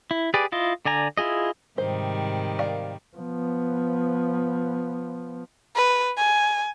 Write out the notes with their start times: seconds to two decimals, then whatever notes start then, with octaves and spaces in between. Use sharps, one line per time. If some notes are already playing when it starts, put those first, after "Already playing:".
0.11 E4
0.34 G4 G#4 B4 D5
0.52 E4 F4 D#5
0.85 D3 D5 G#5 A#5
1.17 E4 F4 G#4 D#5
1.78 G#2 C3 D#3 G3 C5
2.59 A#4 D5 F5
3.17 F3 B3
5.76 B4
6.18 G#5